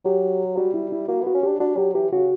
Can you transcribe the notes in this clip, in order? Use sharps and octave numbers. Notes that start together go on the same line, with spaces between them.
F#3 G4
G3 F#4
E4
E4
A#3 F#4
B3
F#4
C#4
D4 G4
D4 F#4
F#3 G4
E3 G4
C#3 F#4